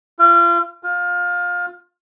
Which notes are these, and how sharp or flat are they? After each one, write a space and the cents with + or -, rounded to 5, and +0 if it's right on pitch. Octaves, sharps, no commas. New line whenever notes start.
F4 -35
F4 +20